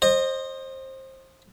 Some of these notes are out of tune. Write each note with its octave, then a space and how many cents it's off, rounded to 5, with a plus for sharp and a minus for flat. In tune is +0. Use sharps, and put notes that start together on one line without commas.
C5 +20 D#5 -20